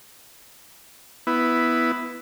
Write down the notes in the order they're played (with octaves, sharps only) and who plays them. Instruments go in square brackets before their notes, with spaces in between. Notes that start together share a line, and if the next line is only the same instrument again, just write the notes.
[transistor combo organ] B3 E4